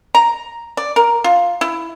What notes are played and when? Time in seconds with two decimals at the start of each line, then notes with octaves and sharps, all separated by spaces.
0.15 A#5
0.77 D5
0.96 A#4
1.24 F4
1.61 E4